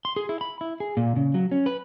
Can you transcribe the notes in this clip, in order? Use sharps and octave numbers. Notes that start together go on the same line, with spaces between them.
C6
G#4
E4
B5
E4
G#4
A#2
C#3
F#3
C#4
B4